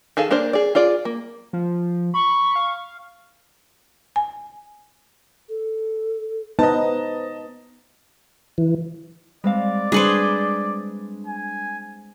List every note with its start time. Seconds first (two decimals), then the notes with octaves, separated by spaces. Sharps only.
0.17 D#3 G#4 A4 F5
0.31 A#3 D4 A#4 C5 D5
0.53 G#4 D5
0.75 F4 G#4 D5
1.05 A#3
1.53 F3
2.14 B5 C#6
2.56 F5
4.16 G#5
5.49 A4
6.59 B3 D#4 B4 C5 D#5 A5
8.58 E3
9.44 G3 G#3 C4 D5 F5
9.92 G3 D4 G#4 B4 C5
11.27 G#5